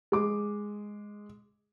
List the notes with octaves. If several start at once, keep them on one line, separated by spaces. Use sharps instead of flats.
G#3 D6